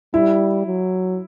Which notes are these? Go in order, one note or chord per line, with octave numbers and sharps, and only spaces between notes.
G3 E4
F#3